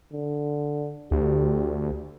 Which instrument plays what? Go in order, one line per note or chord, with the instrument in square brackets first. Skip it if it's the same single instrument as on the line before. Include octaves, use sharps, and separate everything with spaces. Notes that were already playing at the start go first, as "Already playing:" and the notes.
[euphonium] D3
[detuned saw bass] D2 [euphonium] G4